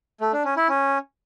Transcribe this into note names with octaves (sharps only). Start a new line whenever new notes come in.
A3
D4
C#4
E4
C#4